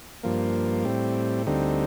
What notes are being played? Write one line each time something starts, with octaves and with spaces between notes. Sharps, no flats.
G2 F3 A#3
A2 G3 C4
D2 D3 G3 C4 D#4